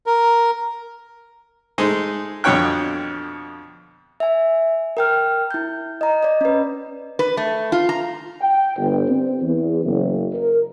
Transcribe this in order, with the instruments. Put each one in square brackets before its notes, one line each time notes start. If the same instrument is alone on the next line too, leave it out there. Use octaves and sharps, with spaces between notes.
[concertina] A#4
[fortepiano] G#3 A3 D#4 G#4 C5
F2 B2 D3 C#5 G5 F#6
[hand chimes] E5 G#5
A#4 G5 F6
E4 G6
D#5 A#5
D5 D#5
C#4 B4
[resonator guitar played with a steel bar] B4
A3
F4
A#5
[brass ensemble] G5
G1
C4
E2
F#1
A#4